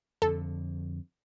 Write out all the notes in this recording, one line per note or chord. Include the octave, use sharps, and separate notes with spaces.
F2 D3 A4